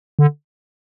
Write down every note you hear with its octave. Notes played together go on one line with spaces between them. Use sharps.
D3